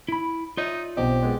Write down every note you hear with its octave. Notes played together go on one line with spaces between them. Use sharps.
E4 B5
D#4 F4 C#5 D5 E5
B1 B2 C4 G4 D#5
G#3 B3 C4